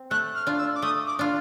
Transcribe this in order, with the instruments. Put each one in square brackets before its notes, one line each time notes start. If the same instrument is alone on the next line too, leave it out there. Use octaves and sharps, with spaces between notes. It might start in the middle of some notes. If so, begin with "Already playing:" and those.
Already playing: [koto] C4
[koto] A3 [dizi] F#6
[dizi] F6
[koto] D4 F4
[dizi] E6
D6
[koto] A3 [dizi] D#6
[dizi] D6
[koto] D4 F4